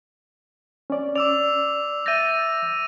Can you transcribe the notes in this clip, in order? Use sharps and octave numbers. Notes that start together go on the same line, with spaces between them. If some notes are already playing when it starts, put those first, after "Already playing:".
C#4 D5
D5 D6 E6 F7
E5 G6 A6 A#6 D#7